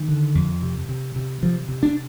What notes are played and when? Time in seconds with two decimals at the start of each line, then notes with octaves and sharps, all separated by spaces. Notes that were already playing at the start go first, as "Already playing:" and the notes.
Already playing: D#3
0.08 D3
0.35 F2
0.62 C3
0.89 C3
1.16 C3
1.42 C3 F3
1.69 C3
1.83 D4